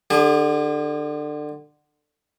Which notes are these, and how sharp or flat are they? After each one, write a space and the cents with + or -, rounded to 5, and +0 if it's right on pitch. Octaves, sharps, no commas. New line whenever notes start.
D3 +25 G#4 -40 A5 -45